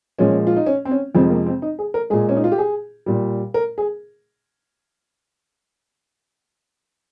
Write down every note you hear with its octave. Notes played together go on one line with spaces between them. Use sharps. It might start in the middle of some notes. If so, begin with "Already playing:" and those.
A#2 F3 G#3 C#4
F4
D#4
C#4
C4
C#4
F2 C3 F3 G#3 C4
A#3
C4
D#4
G#4
A#4
A#2 G#3 G#4
C#4
D#4
F4
G4
G#4
A#2 G3
A#4
G#4